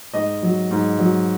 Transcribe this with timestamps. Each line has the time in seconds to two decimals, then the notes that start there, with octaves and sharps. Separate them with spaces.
0.14 G#2 D#5
0.43 F#3
0.71 G#2
0.99 F#3